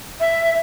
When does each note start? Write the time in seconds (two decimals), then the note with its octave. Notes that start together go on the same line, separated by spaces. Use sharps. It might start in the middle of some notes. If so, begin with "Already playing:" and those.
0.20 E5